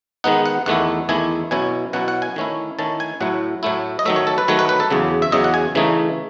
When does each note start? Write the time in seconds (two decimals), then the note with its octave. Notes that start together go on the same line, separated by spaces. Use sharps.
0.24 D#3 G#3 B3 D#4 F#5
0.46 F#5
0.66 E2 D#3 A3 E4 F#5
1.09 E2 D#3 A3 E4 G#5
1.51 B2 F#3 C#4 E4 G#5
1.93 B2 F#3 C#4 E4 F#5
2.08 F#5
2.22 G#5
2.36 D#3 A3 C#4 E4
2.79 D#3 A3 C#4 E4 A5
3.00 G#5
3.20 A2 F#3 A3 E4 F#5
3.63 A2 F#3 A3 E4
3.99 D#5
4.05 D#3 F#3 A3 E5
4.16 C#5
4.27 A4
4.38 B4
4.48 D#3 F#3 A3 C#5
4.59 B4
4.69 B4
4.80 A4
4.90 E2 C#3 F#3
5.22 E5
5.32 E2 C#3 F#3 D#5
5.44 F#5
5.54 G#5
5.75 C#3 E3 A3 D#4